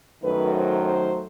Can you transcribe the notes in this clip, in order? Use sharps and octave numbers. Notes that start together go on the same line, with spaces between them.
F#2 D#3 F#3 A3 B4
C5
C5